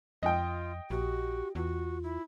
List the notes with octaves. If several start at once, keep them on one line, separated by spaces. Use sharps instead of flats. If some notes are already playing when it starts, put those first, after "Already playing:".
F2 F4 D#5 G5
A#1 F#4 G4
E2 F4 F#4
E4